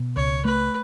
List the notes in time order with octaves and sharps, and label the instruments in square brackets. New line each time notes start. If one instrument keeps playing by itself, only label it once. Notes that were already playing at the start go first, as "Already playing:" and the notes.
Already playing: [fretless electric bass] B2
[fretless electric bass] C#2 [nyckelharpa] C#5
[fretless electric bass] A3 [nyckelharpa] B4